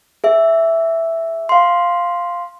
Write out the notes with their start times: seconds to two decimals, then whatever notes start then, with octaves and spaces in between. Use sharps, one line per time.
0.24 G#4 E5
1.49 F5 C6